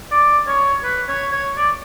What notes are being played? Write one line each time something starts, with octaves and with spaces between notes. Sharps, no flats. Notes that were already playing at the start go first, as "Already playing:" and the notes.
D5
C#5
B4
C#5
C#5
D5